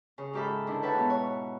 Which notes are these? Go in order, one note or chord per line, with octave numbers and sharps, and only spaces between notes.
C#3
G#2 F4 G4 A4 E5 B5
D3 D#3 D4 E4
B4 C#5 E5 F#5 G5 A5
G#2 B2 B3
C#5